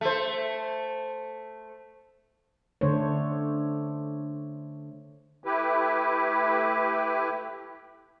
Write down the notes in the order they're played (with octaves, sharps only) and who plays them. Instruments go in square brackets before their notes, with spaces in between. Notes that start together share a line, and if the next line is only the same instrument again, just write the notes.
[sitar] A3 C5
[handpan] D3 A3 D4 C5 C#5
[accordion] A3 E4 G4 B4